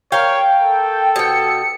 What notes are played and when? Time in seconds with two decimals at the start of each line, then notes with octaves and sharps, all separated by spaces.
0.12 A#4 C#5 F5 G5
0.60 A4
1.16 B2 G5 C#7